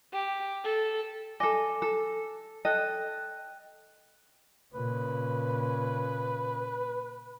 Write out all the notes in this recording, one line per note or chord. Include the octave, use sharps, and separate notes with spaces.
G4
A4
A4 D#5 G#5 D6
A4
A4 D#5 G5 F#6
A#2 C#3 B4